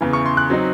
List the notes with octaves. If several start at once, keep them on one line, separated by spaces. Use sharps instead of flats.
E2 C#3 E3
C#6
C6
F#6
F#3 C4 D#4